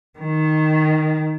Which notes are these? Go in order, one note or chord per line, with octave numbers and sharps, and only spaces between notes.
D#3